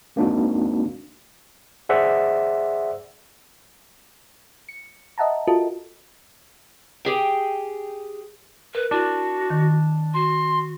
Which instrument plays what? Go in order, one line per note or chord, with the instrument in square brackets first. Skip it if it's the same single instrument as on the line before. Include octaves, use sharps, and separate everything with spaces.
[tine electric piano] G#3 A#3 C4 D4 D#4 F#4
G#4 C5 D5 E5 F#5
[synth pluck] C#7
D#5 E5 F#5 A5 A#5
F4 F#4 A4 A#4 D#5 A5
[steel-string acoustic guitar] G4 G#4 G5
[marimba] A#4 [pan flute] B4
[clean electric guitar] D4 [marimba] E4 [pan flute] F#4
[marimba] D#3
[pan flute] F#4 [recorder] C6